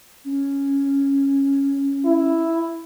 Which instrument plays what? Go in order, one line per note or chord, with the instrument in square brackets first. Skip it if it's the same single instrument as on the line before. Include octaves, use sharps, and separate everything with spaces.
[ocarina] C#4
[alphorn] E4